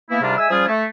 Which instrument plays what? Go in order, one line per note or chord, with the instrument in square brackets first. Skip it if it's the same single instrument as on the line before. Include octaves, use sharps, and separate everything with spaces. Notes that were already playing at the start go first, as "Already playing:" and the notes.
[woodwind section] E3 A#3 B3 E4
G#2 C3 G3 D4 F4 A#4
G#3 E5 G#5 E6
F3 G3 C#4 F4 G#4
A3